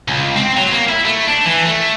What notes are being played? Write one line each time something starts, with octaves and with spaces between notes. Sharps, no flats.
C#2
C4
F#3
A#3
E4
A3
D4
E3
A3